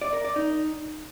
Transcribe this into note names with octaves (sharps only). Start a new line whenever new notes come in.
D5
A#4
D5
D#4